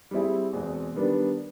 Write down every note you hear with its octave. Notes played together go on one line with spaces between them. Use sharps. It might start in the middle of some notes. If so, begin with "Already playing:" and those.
G3 C4 E4 G#4
E2 B2 G#3 C4
D#3 G3 B3 D4